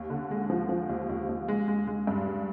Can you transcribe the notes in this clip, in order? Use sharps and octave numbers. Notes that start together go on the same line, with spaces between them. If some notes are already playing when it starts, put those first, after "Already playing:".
Already playing: D#2
D3
G#3
F3
F3
D#2
D#2
D#2
G#3
G#3
G#3
G2
G#3